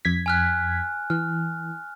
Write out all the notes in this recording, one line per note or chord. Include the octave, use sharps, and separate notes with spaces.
F2 G#6 B6
G#5 F6 F#6
E3 F6